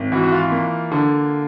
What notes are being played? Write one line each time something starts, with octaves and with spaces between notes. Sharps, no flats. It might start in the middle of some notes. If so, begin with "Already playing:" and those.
Already playing: G#1
E3 F#4
F#4
F4
A#3
D3